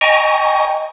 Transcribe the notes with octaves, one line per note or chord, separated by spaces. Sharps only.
D#5 G5 G#5 A#5 C#6